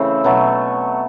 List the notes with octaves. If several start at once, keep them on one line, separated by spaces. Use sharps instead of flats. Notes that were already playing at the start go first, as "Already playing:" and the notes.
Already playing: C#3 E3 A3 C4
B2 F#3 A3